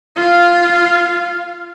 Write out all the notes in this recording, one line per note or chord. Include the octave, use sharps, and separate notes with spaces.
F4 F5